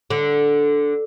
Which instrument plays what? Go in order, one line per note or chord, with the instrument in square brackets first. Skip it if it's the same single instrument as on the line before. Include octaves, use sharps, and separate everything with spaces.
[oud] D3